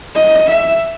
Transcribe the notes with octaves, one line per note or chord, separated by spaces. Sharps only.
D#5
E5